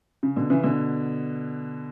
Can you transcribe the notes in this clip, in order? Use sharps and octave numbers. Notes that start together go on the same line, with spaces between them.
C#3
B2 D3
C#3 E3
B2 D3